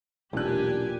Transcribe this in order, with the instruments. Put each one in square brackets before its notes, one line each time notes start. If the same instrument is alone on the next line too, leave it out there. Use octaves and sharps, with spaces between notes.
[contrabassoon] E1 [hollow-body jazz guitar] B1 D4 [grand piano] A#2 F#6 [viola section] G4 G#5